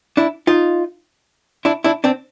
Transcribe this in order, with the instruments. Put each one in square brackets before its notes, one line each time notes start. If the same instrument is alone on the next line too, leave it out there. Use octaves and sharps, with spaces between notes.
[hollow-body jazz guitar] D4 E4
D#4 F4
D4 E4
D4 E4
C4 D4